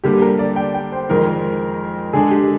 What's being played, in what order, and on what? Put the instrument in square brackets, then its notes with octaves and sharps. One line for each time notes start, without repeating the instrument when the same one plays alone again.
[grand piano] D3 G3 A#3 [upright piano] G4
[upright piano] A#4
D5
G5
G5
C5
[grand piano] F2 D#3 G#3 D#4 A#4
[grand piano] D3 G#3 D4 [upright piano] G#4
[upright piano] G4